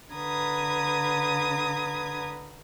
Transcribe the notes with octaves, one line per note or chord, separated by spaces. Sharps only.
D3 B4 A#5 D#6 G#6